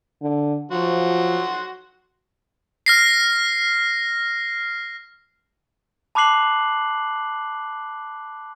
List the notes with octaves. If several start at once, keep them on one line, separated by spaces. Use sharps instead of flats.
D3
F3 F#3 F#4 C6
F6 A#6 C7
A5 B5 D6 F#6 C7 F#7